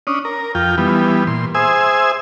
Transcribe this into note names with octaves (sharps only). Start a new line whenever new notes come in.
C#4 D4 D#6
A#4
F2 F4 G5
E3 G3 B3
A#2 C6
G#4 C5 E5 G#5 D#6 E6